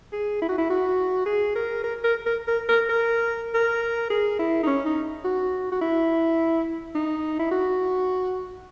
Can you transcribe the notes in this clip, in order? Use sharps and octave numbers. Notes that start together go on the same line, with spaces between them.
G#4
E4
F#4
E4
F#4
G#4
A#4
A#4
A#4
A#4
A#4
A#4
A#4
A#4
G#4
E4
D#4
C#4
D#4
F#4
F#4
E4
D#4
E4
F#4